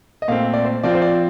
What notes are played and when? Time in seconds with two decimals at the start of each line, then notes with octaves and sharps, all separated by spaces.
0.22 D#5
0.28 A#2 A3 C4 F5
0.54 D5
0.65 C5
0.83 F3 C4 F4 D5
0.95 C5
1.02 D5